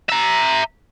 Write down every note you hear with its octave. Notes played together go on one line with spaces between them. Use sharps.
E5 A#5